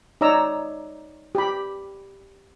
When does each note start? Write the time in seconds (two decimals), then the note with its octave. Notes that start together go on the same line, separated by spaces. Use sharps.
0.21 D#4 C#5 D5 A#5 E6
1.35 G4 B5